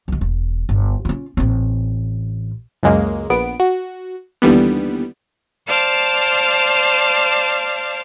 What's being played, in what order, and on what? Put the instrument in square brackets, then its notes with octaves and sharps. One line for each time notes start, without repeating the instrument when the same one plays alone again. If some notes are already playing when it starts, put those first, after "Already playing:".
[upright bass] C2 D#3
E1
G1
C#4 F4
A1 C4
[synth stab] C#2 F#2 G#3 A#3
A#1 B3 D7
F#4
D#2 D3 E3 G3 B3
[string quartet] C5 D5 F5 A5 F6